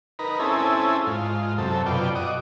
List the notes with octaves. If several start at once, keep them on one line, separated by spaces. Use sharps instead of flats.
D#4 A#4 B4
C4 C#4 E4 G#4 A4
G#2 F4
F#2 C3 A4
F#2 B2 F4 D5 G5
F#4 D#5 D6